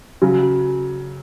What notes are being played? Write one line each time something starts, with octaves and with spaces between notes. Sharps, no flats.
C#3 F#3